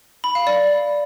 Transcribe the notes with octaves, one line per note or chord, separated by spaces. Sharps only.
B5
F5
D5